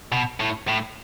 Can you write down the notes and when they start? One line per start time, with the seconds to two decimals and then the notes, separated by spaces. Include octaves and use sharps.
0.12 B2
0.40 A2
0.68 A2